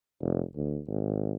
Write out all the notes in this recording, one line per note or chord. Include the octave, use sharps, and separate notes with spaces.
F1
D2
G#1